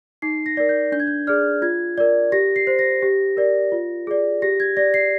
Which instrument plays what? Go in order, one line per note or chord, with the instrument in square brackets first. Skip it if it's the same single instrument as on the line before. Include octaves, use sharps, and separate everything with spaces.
[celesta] D#4 C7
A#6
A#4 D5
G6
D4 G6
G#6
G6
G#4 D5 F6
F4 G#6
A#4 D5
G4 A#6
C7
C5
A#6
G4
A#4 D5
F4
G#4 D5
G4 A#6
G#6
D5 A#6
C7